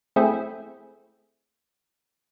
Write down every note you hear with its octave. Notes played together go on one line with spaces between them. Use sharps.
A3 C4 E4 G#4